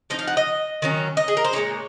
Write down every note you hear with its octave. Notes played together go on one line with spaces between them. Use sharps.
F3 C4 D#4 D#5
F5
F#5
D#5
D#3 F#3 C#4
D#5
G#4
A#4
C5
A#2 G#3 C4 D#4 C#5